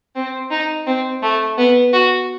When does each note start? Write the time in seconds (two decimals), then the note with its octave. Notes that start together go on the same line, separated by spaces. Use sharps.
0.16 C4
0.51 D#4
0.87 C4
1.23 A3
1.58 B3
1.93 F#4